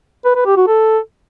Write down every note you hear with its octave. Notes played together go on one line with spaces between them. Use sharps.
B4
B4
G4
F#4
A4